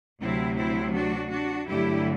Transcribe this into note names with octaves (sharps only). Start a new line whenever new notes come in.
D2 C3 F#3 C4 E4
C4 E4
D4 F#4
D4 F#4
G2 D3 F#3 A3 E4 G4